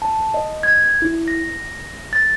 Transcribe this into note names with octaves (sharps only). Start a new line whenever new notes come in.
A5
D#5
G#6
E4
A#6
A6